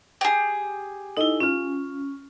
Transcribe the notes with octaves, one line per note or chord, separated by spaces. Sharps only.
G4 G#4
D#4 E4 A4 D#5
C#4 F4 F6